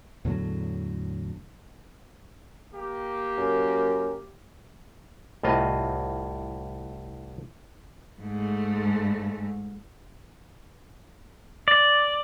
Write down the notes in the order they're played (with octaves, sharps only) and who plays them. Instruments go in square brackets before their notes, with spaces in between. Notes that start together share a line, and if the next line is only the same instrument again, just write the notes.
[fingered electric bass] E2 A2 D3 F#3
[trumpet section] A#3 G4
[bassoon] F#2
[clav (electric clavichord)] C2 A2 F4 D#5
[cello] G#2 A3
[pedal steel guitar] D5